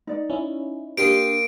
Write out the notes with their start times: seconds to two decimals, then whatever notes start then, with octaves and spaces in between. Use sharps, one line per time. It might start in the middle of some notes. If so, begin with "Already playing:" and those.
0.07 D#4 D5
0.30 C#4 E4
0.97 A#3 D4 G4 C6 D#6 D7